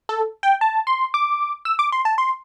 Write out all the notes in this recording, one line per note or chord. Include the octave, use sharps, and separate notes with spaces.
A4
G5
A5
C6
D6
E6
D6
C6
A5
C6